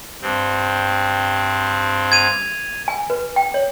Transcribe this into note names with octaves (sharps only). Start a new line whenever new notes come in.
G2 C4
G#6 D#7 F7
G#5
B4
G5
C#5